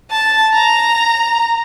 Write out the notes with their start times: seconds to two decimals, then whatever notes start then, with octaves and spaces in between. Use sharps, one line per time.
0.11 A5
0.54 A#5